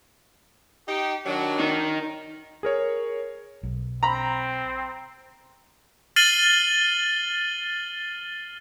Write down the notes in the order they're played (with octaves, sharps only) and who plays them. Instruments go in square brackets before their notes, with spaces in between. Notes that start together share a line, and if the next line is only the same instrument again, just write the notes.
[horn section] D#4 G4
D#3 F#3 D4
[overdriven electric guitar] D#4 A#4
[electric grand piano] G#4 A#4 C#5
[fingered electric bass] B1
[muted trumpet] C4 [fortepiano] A#5 B5
[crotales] F6 A6 C7 D#7 F#7 G7